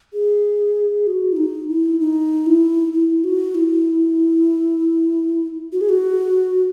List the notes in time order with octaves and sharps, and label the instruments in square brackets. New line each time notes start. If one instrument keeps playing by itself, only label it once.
[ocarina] G#4
F#4
E4
D#4
E4
D#4
E4
E4
F#4
E4
F#4
G#4
F#4